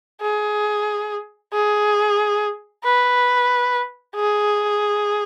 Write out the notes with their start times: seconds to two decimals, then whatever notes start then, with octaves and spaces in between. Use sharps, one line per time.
0.22 G#4
1.53 G#4
2.84 B4
4.16 G#4